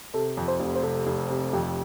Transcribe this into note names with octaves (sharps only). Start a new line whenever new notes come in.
C3 A4
F2
C5
F1
C5
C3 A4
F1
C3
F2 G4